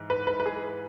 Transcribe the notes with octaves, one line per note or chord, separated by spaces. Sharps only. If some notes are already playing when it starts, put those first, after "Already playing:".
Already playing: G#2 E3
B4
B4
B4
G#4